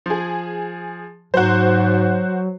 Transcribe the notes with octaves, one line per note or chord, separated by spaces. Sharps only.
F3 G#4
G#2 F#3 F#4 C5